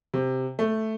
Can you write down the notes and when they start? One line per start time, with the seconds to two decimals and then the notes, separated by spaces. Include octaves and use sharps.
0.14 C3
0.59 A3